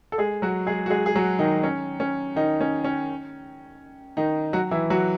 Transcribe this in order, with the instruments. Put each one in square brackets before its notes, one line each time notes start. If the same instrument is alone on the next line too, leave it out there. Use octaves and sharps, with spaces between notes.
[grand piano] A4
G#3 G#4
F#3 F#4
G#3 G#4
F#4
G#3 G#4
G#4
F#3 F#4
D#3 D#4
C#4
C#4
D#3 D#4
C#4
C#4
D#3 D#4
F#3 F#4
E3 E4
F#3 F#4